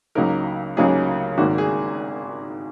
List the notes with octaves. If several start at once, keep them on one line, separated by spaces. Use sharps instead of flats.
C#2 C#3 F#3 A#3 D#4 A#4
C#2 C#3 F#3 A#3 D#4 G#4
G#1 G#2 D#3 A#3 F#4
G#4